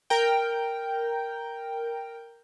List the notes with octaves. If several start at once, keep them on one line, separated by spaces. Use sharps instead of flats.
A#4 G5